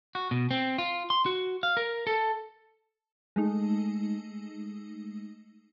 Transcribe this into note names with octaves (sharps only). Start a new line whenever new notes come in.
F#4
B2
C4
F4
C6
F#4
F5
A#4
A4
G#3 A3 D#4